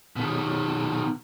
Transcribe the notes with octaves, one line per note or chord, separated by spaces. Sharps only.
B2 D#3